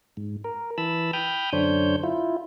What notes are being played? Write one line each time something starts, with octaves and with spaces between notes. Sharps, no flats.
G#2
A#4
E3 A5 B5 E6
G5 B5 D#6 F6 G6
F#2 D3 D4 C5 C#5 G6
E4 F4